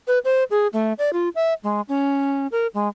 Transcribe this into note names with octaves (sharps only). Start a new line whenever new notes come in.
B4
C5
G#4
A3
D5
F4
E5
G#3
C#4
A#4
G#3